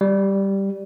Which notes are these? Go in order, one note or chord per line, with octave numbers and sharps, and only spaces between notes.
G3